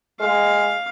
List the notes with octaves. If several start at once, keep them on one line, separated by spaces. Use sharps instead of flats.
G#3 F5